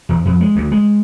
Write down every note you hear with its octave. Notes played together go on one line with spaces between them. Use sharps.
E2
F2
G#3
D2
G#3